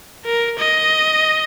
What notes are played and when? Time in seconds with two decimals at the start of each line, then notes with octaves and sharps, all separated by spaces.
0.25 A#4
0.59 D#5